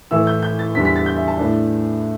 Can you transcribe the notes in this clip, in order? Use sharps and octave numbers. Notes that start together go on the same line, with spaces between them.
A2 E3 A3 E6
G6
G6
A6
E2 D3 G3 B6
B6
A6
G6
E5
A5
A2 A3 D4